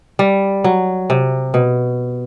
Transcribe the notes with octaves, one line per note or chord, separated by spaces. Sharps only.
G3
F#3
C3
B2